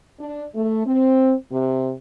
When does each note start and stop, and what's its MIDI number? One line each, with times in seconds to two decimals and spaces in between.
0.20 0.46 62
0.55 0.86 57
0.86 1.35 60
1.51 1.92 48